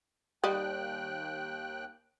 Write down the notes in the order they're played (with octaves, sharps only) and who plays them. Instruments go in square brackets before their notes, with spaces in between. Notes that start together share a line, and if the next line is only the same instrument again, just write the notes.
[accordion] D#2 G5 F#6 [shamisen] G3 D#5